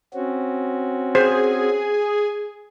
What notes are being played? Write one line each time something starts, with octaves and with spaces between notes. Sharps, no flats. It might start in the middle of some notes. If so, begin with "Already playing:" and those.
C4 C#4 F#4
G#4 C5